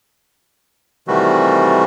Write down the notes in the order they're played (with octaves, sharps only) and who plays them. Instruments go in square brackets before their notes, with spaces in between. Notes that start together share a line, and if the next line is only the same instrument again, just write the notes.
[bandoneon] C3 D#3 E3 G3 A3 F#4